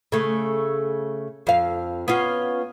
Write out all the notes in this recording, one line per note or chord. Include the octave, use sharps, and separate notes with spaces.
C#3 A3
F2 F5
B3 C#4 F4